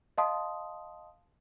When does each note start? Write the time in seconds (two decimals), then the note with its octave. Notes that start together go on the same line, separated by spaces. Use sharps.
0.18 D#5 F5 A5 C6 D#6